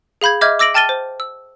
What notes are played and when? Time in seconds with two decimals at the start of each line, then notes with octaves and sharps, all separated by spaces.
0.22 G#4 F5 B5 G6 G#6
0.41 D#5 E5 D6 F6 G6 G#6
0.59 D6 E6 A#6 D7 F#7
0.74 G5 A5 F6 A6 D#7 G7
0.89 C5
1.20 E6